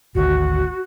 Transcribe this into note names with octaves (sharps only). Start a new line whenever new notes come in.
G#1 D2 F#4